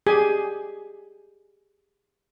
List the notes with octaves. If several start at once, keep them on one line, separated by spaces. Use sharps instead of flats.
G4 G#4 G#5